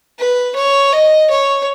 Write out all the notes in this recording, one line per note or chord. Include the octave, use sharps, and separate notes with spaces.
B4
C#5
D#5
C#5